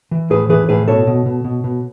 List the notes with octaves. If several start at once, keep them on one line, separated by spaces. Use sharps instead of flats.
E3
A2 G#4 B4
E3 G#4 B4
A2 G#4 B4
B2 A4 C#5
B2
B2
B2
B2